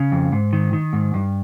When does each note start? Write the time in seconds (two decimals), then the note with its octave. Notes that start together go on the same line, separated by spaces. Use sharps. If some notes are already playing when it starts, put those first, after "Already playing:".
Already playing: C#3
0.12 F2
0.32 G#2
0.53 D#3
0.73 D#3
0.93 G#2
1.14 G2